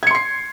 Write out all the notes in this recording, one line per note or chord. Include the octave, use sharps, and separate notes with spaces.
C6 G#6 C7 C#7